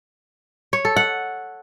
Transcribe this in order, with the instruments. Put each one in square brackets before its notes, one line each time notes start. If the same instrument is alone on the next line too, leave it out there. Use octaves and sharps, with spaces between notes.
[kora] C#5
A4
F#5